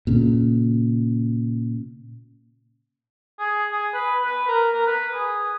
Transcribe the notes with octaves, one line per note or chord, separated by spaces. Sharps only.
A#2 C#3
G#4
G#4
B4
B4
A#4
A#4
B4
G#4